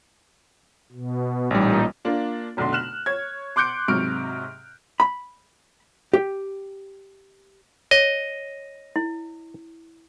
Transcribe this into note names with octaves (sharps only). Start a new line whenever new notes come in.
B2
A1 A#2 G3 D#4
A#3 D4 F4
F1 B1 D3 D4 C6
F6 F#6 E7 F#7
C#5 G#6
C6 D6 F#6 G6 C#7 D7
G#2 C3 F#3 C#6 F6 D7
B5
G4
C#5 D#5
E4